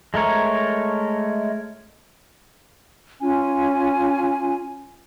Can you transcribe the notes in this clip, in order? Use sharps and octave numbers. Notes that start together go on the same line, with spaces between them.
G#3 A3 A#4 C#5
C#4 F4 G#5